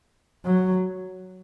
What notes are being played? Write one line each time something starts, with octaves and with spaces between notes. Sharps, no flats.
F#3